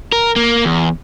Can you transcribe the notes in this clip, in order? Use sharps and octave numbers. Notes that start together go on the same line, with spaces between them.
A#4
A#3
E2